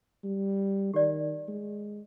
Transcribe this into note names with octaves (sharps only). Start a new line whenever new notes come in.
G3
D#3 G4 D5
G#3